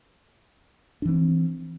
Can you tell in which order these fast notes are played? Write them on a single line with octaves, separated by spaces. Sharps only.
D4 E3 C4